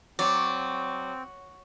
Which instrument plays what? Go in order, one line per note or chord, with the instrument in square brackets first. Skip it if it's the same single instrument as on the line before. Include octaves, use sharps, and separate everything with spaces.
[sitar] F#3 [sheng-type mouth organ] C4 [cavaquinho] D5